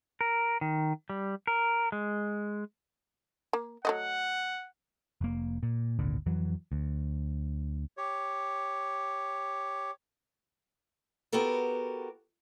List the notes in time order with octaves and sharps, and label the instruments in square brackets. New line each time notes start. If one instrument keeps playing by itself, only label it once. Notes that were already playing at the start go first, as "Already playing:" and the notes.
[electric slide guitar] A#4
D#3
G3
A#4
G#3
[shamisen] A#3
[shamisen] F#3 A3 D#5 [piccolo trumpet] F#5
[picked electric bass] F1 A#3
A#2
G#1 D2 A#2 D3
F2 E3 F#3
D2
[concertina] G4 C#5
[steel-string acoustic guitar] B3 F#4 G4 A4 A#4